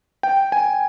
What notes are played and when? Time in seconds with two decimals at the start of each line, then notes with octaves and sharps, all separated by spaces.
0.23 G5
0.52 G#5